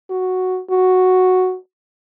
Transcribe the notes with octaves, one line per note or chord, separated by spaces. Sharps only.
F#4
F#4